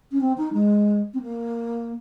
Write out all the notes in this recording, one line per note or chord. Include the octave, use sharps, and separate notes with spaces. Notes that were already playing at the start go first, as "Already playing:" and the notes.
C#4
C4
D#4
G#3
C4
A#3